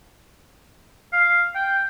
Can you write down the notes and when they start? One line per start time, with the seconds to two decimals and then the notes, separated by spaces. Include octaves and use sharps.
1.13 F5
1.55 G5